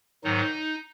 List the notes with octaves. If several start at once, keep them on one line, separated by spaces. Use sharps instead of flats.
G#2 D#3 F#3 D#4